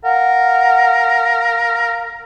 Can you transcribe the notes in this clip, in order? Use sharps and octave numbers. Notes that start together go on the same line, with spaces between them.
A#4 F5 F#5